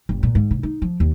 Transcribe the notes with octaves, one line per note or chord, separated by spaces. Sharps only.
G1
A#2
G#2
C3
D#4
F3
D#2